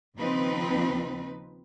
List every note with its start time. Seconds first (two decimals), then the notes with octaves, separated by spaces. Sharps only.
0.16 D#2 C#3 F3 C4 D#4 B4